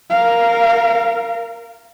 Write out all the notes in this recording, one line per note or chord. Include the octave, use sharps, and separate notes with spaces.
A#4 F5